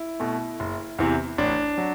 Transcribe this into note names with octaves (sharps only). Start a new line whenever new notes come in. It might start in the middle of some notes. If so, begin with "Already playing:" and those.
Already playing: E4
B2 A3
F#1
E2 C3 E3
A1 D4
F#3